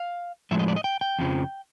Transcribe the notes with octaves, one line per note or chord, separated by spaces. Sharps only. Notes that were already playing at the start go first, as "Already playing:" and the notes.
Already playing: F5
A2 F3 G#3 E5
D#5
D5
D#5
G5
G5
F2 C#3 F3